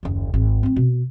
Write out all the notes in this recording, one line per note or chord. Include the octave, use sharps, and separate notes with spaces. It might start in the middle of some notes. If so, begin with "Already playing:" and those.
F#1 D#2
G#1
A3 C4
B2